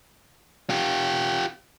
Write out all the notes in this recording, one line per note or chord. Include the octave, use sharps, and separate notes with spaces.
F4 G4